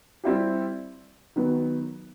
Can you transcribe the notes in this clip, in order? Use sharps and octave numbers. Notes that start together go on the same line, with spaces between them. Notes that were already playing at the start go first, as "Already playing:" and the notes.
G3 C4 E4 G4
D#3 F#3 B3